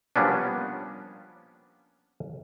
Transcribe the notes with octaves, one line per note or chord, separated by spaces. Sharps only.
F3 G3 A#3 B3 C#4 D4